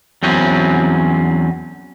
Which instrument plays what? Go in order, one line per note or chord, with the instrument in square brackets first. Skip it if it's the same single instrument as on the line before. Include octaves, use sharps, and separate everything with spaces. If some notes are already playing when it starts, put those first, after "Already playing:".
[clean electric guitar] E2 F#3 C4 C#4